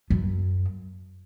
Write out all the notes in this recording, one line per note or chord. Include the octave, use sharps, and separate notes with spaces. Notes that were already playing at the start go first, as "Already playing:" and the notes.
F#2